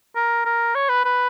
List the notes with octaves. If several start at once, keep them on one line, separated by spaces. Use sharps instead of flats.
A#4
A#4
C#5
B4
B4